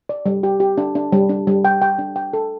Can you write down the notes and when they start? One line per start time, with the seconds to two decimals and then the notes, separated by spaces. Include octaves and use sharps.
0.09 D5
0.26 G3
0.43 G4
0.60 G4
0.78 D4
0.95 D4
1.12 G3
1.29 D4
1.47 G3
1.65 G5
1.82 G5
1.99 D4
2.16 G5
2.33 A4